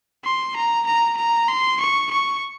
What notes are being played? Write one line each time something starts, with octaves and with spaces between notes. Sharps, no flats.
C6
A#5
A#5
A#5
C6
C#6
C#6